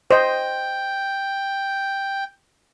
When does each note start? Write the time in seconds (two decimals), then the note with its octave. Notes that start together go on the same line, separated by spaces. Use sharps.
0.11 C5 D#5 G5